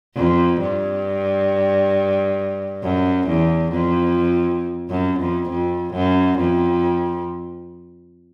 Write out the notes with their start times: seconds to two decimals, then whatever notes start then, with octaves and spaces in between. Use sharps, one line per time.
0.16 F2
0.60 G2
2.83 F#2
3.27 E2
3.71 F2
4.90 F#2
5.20 F2
5.49 F2
5.93 F#2
6.38 F2